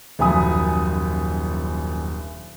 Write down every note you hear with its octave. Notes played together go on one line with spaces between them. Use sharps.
D#1 A#1 F#2 G#5 B5 D#6